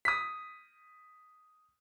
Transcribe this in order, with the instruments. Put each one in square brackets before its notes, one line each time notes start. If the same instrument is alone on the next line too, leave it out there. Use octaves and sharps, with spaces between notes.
[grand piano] D#6 B6